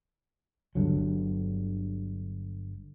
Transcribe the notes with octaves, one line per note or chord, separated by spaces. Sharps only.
G1 G2 D3 F#3